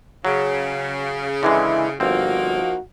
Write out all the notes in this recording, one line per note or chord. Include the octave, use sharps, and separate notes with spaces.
C#3 F#3
D3 E3 G#3 E4
G1 F3 A#3 C4 D#4 F#4